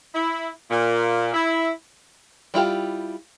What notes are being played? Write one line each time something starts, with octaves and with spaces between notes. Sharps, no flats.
E4
A#2
E4
G3 E4 F4 G4